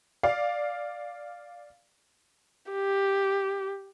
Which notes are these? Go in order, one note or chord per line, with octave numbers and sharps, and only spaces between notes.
D5 F5
G4